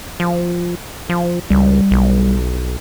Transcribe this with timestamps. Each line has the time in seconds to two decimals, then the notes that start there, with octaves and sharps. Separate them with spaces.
0.20 F3
1.09 F3
1.50 C#2 G3
1.91 B1